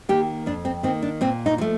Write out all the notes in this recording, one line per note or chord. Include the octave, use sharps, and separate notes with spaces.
D#3 A#3 G4
F2 D4
C4
D#3 A#3 C4
D4
A#2 C4
D#4
F3 A3